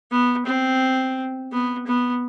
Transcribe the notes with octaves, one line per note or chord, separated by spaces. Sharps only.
B3
C4
B3
B3